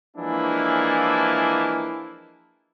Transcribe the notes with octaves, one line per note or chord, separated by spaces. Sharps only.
E3 F3 G#3 A#3 D4 E4